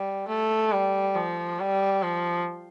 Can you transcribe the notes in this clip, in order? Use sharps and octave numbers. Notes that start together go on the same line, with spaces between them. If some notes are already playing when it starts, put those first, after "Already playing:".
Already playing: G3
A3
G3
F3
G3
F3